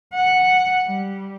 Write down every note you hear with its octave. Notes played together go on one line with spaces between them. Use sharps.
F#5
G3